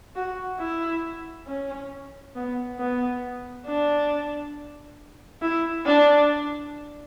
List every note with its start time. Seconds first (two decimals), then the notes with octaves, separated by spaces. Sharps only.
0.16 F#4
0.60 E4
1.47 C#4
2.36 B3
2.80 B3
3.66 D4
5.42 E4
5.86 D4